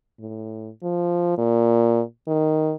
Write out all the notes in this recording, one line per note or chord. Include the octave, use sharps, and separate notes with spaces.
A2
F3
A#2
D#3